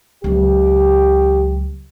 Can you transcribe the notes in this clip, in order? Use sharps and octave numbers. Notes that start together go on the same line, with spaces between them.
C#2 F#3 G4